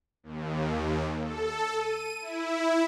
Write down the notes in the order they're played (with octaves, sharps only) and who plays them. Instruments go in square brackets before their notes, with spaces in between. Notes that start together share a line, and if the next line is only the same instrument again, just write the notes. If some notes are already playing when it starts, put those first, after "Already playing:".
[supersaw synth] D#2
A4
D#7
E4